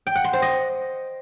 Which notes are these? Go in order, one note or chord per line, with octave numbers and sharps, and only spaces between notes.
G5
F#5
C6
C5
D#5